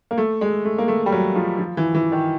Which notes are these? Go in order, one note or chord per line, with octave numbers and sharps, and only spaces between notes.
A#3
A3
G#3
A3
A#3
A3
G3
F#3
F3
F3
E3
E3
D#3